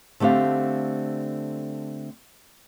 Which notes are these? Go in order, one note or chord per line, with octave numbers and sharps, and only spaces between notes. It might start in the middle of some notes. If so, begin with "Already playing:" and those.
D3 A3 C4 G4 F5